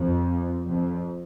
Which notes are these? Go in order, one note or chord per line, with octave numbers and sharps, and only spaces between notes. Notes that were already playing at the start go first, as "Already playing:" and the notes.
Already playing: F2
F2